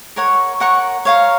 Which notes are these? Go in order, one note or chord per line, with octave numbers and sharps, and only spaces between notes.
A#4 C#5 F#5 C#6
A#4 C#5 F#5 C#6
C#5 F5 A#5